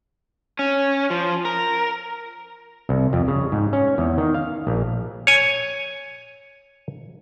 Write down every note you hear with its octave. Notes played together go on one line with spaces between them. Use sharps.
C#4
F3
A#4
C2
F2
C#3
G#2
C#4
E2
D#3
F5
A#1
C#5 G#5